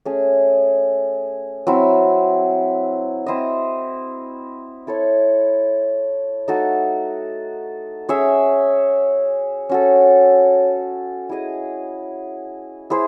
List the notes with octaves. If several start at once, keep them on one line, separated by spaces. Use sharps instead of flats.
A3 C#4 G#4
F#3 C4 E4
C4 E4 C5 D#5
E4 A4 C#5
A3 D#4 F#4 A4
C#4 G#4 C#5 E5
C#4 F#4 A4
E4 G#4 D#5
E4 G#4 C5